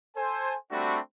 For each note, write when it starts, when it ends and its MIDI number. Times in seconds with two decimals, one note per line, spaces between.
0.16 0.55 69
0.16 0.55 72
0.16 0.55 80
0.71 0.99 55
0.71 0.99 57
0.71 0.99 60
0.71 0.99 62
0.71 0.99 66
0.71 0.99 83